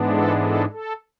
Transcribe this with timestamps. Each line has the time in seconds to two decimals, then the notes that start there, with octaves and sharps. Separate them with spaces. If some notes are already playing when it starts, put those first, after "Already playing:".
Already playing: G#2 E3 G#3 B3 D4
0.11 A4
0.41 A4
0.72 A4